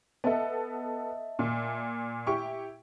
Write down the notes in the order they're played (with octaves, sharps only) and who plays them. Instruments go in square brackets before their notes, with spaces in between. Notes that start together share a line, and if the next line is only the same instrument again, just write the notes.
[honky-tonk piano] B3 A4 [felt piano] D#5 E5 A5
[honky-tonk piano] A#2
[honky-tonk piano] E4 G4 [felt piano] C#6